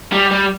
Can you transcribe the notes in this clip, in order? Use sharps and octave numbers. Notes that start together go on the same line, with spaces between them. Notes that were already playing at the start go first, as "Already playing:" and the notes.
G3
G3